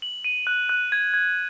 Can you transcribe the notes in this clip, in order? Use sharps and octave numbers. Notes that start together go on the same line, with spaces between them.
F#7
D#7
F#6
F#6
G#6
G#6